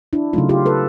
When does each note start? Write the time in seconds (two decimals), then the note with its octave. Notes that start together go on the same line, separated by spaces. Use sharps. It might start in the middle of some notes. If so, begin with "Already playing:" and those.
0.13 D4 E4
0.33 C#3 F#3 A3 D#4 F4
0.49 F4 G4
0.66 A4 B4